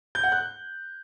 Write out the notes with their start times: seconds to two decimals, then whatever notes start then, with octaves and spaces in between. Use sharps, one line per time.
0.15 G6
0.24 F#5
0.32 F#6